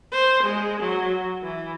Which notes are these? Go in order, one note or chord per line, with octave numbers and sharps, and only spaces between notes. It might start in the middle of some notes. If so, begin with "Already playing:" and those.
C5
G#3
F#3
E3